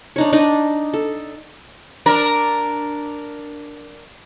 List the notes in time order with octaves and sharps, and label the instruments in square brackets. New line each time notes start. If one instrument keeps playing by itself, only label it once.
[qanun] D4 D#4 C#5
D4 D#4 D#5
A4
[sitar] D4 A#4